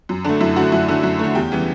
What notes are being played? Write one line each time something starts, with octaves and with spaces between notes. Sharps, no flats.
F#2
D3 A3 D4
F#2 E4
D3 A3 F#4
F#2 E4
D3 A3 E4
F#2 E4
D3 A3
E2 G4
C#3 E3 G3 B3